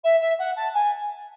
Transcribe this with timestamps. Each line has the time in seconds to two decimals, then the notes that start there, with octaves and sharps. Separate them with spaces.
0.04 E5
0.21 E5
0.38 F#5
0.56 A5
0.74 G#5